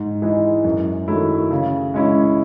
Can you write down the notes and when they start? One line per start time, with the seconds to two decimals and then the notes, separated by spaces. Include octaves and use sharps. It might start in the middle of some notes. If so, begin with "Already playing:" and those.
Already playing: G#2
0.22 E3 G#3 D#4
0.65 F#2
1.08 D#3 F#3 A3 E4
1.51 C#3
1.94 G#3 C#4 E4